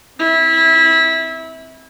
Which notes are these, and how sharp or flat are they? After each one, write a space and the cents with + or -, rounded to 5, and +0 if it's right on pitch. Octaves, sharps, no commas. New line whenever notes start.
C4 +0 E4 -20